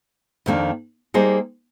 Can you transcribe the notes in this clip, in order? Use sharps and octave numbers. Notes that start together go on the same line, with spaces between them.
F2 D#3 A#3 D4
G3 A#3 D#4 G#4 C5